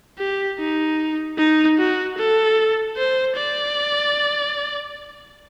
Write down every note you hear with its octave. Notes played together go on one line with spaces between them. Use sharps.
G4
D#4
D#4
F#4
A4
C5
D5